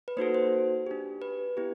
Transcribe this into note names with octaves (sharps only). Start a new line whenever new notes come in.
B4
A#3 D#4 F#4 A4 C5
C5
D4 G4
B4
B3 E4 G4